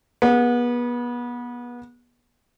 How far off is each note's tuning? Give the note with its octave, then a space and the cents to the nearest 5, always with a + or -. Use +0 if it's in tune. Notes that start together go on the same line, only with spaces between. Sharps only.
B3 -30 G#4 +0